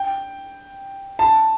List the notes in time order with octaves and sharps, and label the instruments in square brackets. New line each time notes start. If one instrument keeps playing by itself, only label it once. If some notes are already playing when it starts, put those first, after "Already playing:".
Already playing: [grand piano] G5
A5